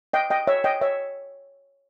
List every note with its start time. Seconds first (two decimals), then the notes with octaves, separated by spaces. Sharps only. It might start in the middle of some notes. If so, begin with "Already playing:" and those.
0.13 D#5 G5
0.30 D#5 G5
0.47 C#5 E5
0.64 D#5 G5
0.81 C#5 E5